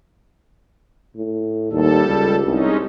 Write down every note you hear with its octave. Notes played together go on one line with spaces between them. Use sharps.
A2
D#2 G3 A4
C#2
C2 G#3 C#4 D#4